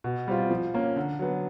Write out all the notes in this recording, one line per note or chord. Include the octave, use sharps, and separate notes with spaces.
B2
G3 C4 F4
F3
A#3 C#4
D3
F#3 B3